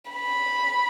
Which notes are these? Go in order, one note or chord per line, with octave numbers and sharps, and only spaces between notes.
B5